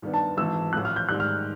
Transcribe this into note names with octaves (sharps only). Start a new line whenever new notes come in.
G2 D#3 G3 B3
A5
G#1 G#2 E3 E6
A1 A2 F3 F#6
F6
G6
G#2 D#3 G3 F#6
F6